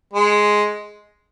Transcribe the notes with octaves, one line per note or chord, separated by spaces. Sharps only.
G#3